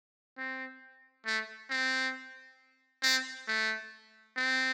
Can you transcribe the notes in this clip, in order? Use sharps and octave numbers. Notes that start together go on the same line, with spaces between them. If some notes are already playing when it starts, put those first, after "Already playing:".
C4
A3
C4
C4
A3
C4